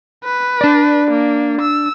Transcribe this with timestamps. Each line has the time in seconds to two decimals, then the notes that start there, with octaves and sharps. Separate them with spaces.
0.24 B4
0.61 D4 D5
1.11 A#3
1.61 E6